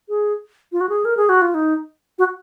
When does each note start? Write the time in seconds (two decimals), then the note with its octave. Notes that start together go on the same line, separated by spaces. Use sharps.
0.09 G#4
0.72 F4
0.81 F#4
0.89 G#4
1.05 A#4
1.17 G#4
1.29 F#4
1.42 F4
1.54 D#4
2.19 F#4